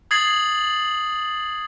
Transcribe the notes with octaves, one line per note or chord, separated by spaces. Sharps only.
D#6 G#6 A6 C7 F#7